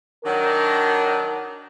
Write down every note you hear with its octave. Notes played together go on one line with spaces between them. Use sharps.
D#3 F#3 D4 A#4